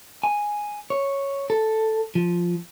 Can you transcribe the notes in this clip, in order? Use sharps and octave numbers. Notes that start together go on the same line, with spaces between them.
G#5
C#5
A4
F3